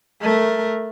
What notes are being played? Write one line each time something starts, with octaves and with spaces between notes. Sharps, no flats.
A3 A#4